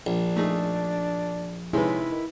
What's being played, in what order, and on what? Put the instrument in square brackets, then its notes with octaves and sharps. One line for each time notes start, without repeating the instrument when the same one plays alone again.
[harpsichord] A#1 [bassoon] D4
[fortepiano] A3 D#4 G#4
[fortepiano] C3 D#3 G#3 [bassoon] C#4 [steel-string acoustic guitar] E4 B4
[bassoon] D#3